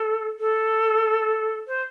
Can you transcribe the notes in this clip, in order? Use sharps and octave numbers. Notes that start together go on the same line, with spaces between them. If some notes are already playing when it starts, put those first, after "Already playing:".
Already playing: A4
A4
C5